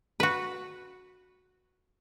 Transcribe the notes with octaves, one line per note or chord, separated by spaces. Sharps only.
F#4 B4